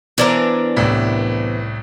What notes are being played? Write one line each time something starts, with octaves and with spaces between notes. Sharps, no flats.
E3 B3 D4 A#4 C5 D5 D6
C2 A2 E4